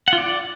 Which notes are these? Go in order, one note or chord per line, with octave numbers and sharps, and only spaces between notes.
F#5
F4
D5